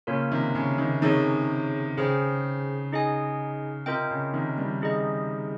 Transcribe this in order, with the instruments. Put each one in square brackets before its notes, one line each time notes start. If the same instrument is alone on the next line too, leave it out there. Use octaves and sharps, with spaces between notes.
[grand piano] C#3 [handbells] A#3 F4 A#4 C#5
[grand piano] C3 D#3
C#3
C3 D#3
[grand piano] C3 D#3 [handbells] D#4 G#4 C#5
[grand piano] C#3 [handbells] G#4 C5 G5
[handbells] D#4 G#4 D#5 G#5
[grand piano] C3 [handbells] F4 A#4 D#5 G5
[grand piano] C#3
C3 D#3
D#3 G3
[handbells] D#4 G#4 D#5